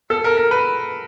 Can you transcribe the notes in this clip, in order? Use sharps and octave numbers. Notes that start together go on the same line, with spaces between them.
A4
A#4
A#4
B4